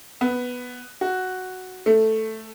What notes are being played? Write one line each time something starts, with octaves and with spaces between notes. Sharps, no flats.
B3
F#4
A3